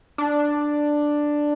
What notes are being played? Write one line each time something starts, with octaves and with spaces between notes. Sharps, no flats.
D4